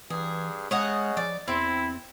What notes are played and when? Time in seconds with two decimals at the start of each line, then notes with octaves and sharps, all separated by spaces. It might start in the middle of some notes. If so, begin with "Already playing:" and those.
0.10 G2 E3 G#4
0.71 C#3 G#3 C#5 D#5 F#5
1.17 F3 D5
1.48 E2 C4 E4